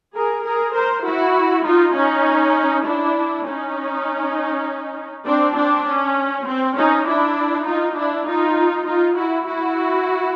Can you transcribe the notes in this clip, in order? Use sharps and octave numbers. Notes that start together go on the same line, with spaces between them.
G#4 A#4
G#4 A#4
A#4 C5
E4 F#4
D#4 F4
C#4 D#4
D4 E4
C#4 D#4
C4 D4
C4 D4
C#4
C4
C#4 D#4
D4 E4
D#4 F4
D4 E4
D#4 F4
D#4 F4
E4 F#4
E4 F#4